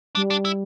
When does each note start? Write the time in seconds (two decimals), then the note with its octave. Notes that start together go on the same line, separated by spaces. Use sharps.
0.15 G3 D4
0.30 D4
0.45 E4